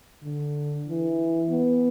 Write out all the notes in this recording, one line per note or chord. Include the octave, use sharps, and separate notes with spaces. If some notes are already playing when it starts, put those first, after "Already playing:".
D3
E3
B3